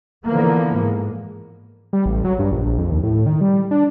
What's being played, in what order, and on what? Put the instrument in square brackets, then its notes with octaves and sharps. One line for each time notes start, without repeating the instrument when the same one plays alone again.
[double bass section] D3 E3 F3 A#3 B3
G#2
[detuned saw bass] G3
A1
F#3
G2
A#1
A#1
F2
D#2
A2
D#3
G3
D4